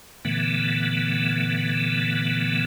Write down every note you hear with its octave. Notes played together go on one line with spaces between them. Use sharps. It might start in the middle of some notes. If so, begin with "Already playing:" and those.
A#2 D3 E3 A3 B3